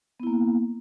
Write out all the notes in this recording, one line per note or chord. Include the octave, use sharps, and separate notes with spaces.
A#3 B3 E4